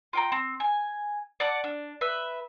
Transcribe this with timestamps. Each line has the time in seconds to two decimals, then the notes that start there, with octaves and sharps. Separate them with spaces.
0.13 F4 G5 A#5
0.32 C4
0.60 G#5
1.40 D5 F#5 A5 D6
1.64 D4
2.01 B4 E5